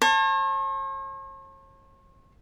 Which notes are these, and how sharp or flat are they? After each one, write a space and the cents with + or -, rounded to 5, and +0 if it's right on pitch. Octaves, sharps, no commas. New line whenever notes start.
C#5 -45 A5 +15